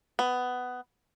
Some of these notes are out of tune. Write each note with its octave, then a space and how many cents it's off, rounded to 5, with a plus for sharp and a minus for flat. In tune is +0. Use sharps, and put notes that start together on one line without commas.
B3 +15